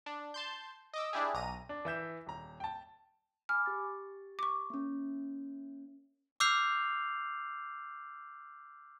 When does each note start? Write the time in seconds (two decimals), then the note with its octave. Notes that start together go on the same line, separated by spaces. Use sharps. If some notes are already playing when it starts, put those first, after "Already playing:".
0.06 D4
0.34 A5 C6 G6
0.93 D#5 D6 E6
1.13 D4 E4 G4 G#4
1.34 B1 A#5 D#7
1.69 D4
1.85 E3 E5 G6 E7
2.26 D#1 A#5
2.60 G5 A5
3.49 G#5 B5 D6 F6
3.66 G4 A6
4.39 C#6 D6
4.70 A#3 C#4
6.40 D6 E6 F6 G6 C7 F7